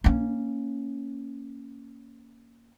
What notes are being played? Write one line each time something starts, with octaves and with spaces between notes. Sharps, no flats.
A#3 C#4